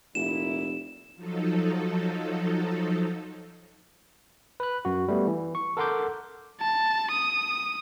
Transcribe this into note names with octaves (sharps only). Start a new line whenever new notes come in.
F1 A#2 E4 E7
F3 F#3 D#4 A4
B4 F#6
F#2 F#4
G3 A3 B3
E3
C#6
A4 A#4 F#5 C6 D6 G6
A5
D#6